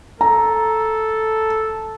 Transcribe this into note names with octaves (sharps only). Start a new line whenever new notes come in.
A4 A#5